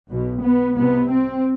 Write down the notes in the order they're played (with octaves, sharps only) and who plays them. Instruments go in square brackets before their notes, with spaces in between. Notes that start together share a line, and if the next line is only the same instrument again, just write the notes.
[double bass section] B1 B2
B3
C2 C3 B3
C4